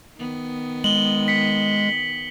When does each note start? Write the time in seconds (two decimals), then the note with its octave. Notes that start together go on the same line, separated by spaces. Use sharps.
0.18 D#3 B3
0.84 G#3 F#7 G7
1.28 B6 C#7